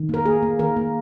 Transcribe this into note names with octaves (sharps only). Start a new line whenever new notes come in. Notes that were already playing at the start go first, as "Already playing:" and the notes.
Already playing: D#3
A#3 A#4
A#3 G#4
A#3
D#3 A#4
A#3